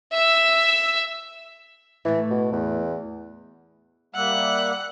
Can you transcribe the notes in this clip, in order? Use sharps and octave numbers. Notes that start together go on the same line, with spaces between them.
E5 E6
A2 E3 A3
B2
E2
G3 A#3 E5 F#5